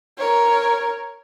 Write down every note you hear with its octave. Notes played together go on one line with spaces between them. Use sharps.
A#4 C#5